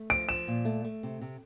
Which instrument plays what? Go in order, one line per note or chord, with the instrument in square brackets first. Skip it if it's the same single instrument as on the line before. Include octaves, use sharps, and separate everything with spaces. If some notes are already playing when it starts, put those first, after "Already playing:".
Already playing: [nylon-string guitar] A3
[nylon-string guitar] F3 [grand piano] D7
[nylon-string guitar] F3 [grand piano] E7
[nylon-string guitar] A#2
A3
A3
C3
C3